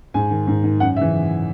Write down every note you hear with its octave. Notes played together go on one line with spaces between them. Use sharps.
G#2 G#5
D#3
G#2
D#3
F#2 F#5
C#3 E3 E5